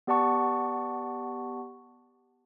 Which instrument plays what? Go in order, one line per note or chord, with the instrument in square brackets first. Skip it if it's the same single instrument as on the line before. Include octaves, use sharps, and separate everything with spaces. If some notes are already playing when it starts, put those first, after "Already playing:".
[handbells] B3 G4 D5 F#5 A5 C#6